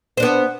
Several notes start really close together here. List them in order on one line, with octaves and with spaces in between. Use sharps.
C5 D4 B3